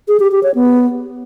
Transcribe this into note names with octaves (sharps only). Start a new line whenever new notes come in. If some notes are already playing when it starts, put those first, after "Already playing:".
G#4
G4
G4
C#5
B3